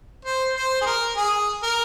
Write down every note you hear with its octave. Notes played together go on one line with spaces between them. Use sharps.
C5
C5
G#4
A#4
G#4
A#4